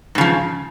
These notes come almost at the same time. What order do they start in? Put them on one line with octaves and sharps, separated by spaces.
G#2 C#3 F3